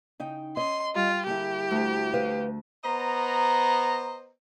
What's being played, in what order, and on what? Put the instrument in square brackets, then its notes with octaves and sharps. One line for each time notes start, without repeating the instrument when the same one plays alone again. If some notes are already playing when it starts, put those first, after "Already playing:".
[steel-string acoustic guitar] C#3 D#4 G5
[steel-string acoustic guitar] C#4 D#5 [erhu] C6
[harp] G3 [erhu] F4
[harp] D3 A#3 [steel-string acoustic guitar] E4 G#4 [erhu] G4
[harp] D2 A3
[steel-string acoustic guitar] B4 C5 F5
[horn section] B3 C5 D#5 A#5